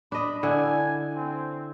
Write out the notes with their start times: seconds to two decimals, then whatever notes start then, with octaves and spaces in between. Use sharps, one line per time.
0.12 D4 D#5 B5
0.43 D3 E4 G#5
1.15 C4